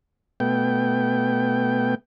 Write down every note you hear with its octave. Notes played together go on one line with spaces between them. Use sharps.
B2 A3 B3 G5